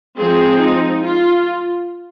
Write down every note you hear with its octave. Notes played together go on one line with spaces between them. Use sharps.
F3 G#3 C4 G#4
D#4
F4